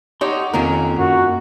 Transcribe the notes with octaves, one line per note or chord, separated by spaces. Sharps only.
D#4 G4 C#5 F#5 A5 C6
F2 D#3 A#3 C#4 F4 A#4
F#2 F#4